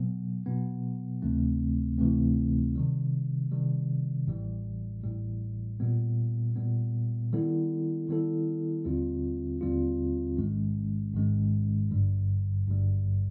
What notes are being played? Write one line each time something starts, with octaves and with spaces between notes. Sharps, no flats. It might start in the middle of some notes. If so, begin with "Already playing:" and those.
Already playing: B2 F#3 B3
B2 F#3 B3
D2 C3 E3 A3 C4
D2 C3 E3 A3 C4
C3 D#3 G3
C3 D#3 G3
A1 A2 E3 G3
A1 A2 E3 G3
A#2 G3 B3
A#2 G3 B3
D#3 G3 B3 E4 A4
D#3 G3 B3 E4 A4
D#2 D3 G3 C4 F4
D#2 D3 G3 C4 F4
A1 G#2 D#3 G#3 C#4
A1 G#2 D#3 G#3 C#4
G#1 G2 D3 G3
G#1 G2 D3 G3